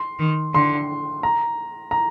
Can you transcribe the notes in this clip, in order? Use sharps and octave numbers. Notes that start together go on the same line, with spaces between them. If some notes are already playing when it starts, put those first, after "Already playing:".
Already playing: C6
D#3
D3 C6
A#5
A#5